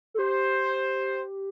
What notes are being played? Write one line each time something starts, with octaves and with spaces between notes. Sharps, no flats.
A4
G4 C5